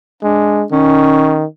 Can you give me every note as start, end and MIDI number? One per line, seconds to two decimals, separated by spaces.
0.23 0.64 56
0.23 0.65 62
0.72 1.44 51
0.72 1.43 61